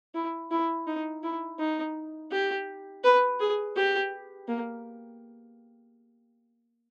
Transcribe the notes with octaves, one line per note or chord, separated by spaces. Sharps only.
E4
E4
D#4
E4
D#4
G4
B4
G#4
G4
A#3